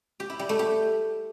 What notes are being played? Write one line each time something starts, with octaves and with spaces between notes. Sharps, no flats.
G4
E4
G3
A3
G4